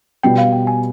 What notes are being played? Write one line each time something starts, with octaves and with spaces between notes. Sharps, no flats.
B2 G3 B3 G5
F5
G5
G#5